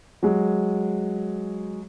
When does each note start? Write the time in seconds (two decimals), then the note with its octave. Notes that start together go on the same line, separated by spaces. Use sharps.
0.23 F#3 G#3